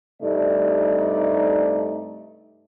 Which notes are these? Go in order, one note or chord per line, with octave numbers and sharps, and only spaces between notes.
G2 C3 A3 D#4 D5